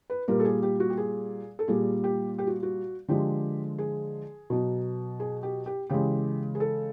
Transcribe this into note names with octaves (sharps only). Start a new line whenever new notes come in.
B4
A#2 G3 A#4
A4
G#4
G4
F#4
G4
G#4
A4
A#2 G3 G#4
G4
G4
F#4
F#4
D3 F3 G#3 G4
G#4
B2 F#3
G#4
G4
G4
C#3 E3 G#3 G4
G#4
A4